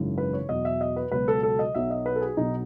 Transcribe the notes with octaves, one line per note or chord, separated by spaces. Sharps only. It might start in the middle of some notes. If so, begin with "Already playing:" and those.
Already playing: G#1 F#2 C#3 E3
B4
C#5
E2 B2 F#3 D#5
E5
D#5
B4
C#2 B2 F#3 B4
A4
A4
D#5
B1 B2 F#3 E5
D#5
B4
A4
G#4
B1 B2 F#3 D#4